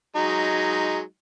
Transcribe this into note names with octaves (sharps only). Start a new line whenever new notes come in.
F#3 G#3 D#4